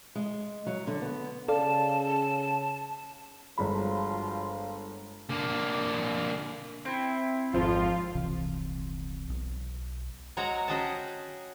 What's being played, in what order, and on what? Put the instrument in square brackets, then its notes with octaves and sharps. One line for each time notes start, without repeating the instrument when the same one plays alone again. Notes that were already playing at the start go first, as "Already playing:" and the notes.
[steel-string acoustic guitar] G#3
F#3
D3
B3
[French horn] C#3 [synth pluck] A4 D5 F5 [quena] A5
[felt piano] G1 G#3 B5 [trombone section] F3 F#3 F4
[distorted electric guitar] D3 A#3
[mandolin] C4 E4
[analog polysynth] G#1 F2 F3 [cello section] F4
[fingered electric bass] D#1 C2 C3 E3
B1
[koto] F#3 G#3 F#4 C#5 F#5 A#5
C#4 F#4 G#4 D#5 G5 A5